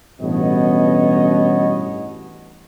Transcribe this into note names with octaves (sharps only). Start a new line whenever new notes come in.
A1 G2 B2 B3 C#5 D#5